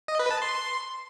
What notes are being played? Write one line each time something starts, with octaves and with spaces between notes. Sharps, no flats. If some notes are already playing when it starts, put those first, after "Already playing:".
D#5
B4
A5
C6